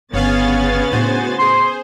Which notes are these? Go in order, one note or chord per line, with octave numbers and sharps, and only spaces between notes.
G1 C#3 B3 C#5 F5 G#5 A6
A2 D4 F#4 C5 G#5
G#4 C5 C6